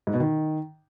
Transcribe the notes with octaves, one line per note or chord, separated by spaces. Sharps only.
G#2
B2
D#3